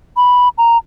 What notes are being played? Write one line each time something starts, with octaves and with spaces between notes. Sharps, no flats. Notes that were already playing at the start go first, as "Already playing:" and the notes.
B5
A#5